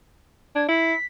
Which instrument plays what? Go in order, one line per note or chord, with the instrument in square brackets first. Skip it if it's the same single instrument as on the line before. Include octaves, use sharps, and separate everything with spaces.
[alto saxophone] D4 [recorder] G#6
[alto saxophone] E4 [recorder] B6